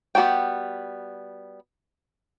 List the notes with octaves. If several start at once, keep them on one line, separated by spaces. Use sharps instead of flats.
G3 B3 F#4 C#5 G5